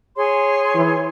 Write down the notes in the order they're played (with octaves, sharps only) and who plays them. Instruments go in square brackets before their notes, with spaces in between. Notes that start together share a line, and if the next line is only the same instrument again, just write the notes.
[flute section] G#4 C#5 C6
[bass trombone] E3